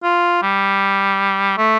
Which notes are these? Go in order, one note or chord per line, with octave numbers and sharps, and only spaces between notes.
F4
G3
A3